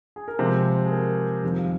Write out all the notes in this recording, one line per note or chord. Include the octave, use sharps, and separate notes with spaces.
G#4
A#4
C3 F3 G#3 C5
G#4
A#4
F2 D#3 G3 C4 F4 G#4
F5